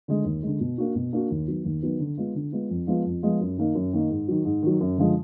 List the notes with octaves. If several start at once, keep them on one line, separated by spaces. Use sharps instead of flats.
D3 G#3
D#2
D3 G#3
B2
A#3 D4 F#4
B2
A#3 D4 F#4
D#2
D#3 F#3 B3
D#2
D#3 F#3 B3
D3
G#3 B3 F4
D3
G#3 B3 F4
F2
F3 G#3 B3 F4
F2
F3 G#3 B3 F4
F#2
D#3 A#3 D#4
F#2
D#3 A#3 D#4
G#2
D#3 F#3
G#2
D#3 F#3
F#2
D3 F3 G#3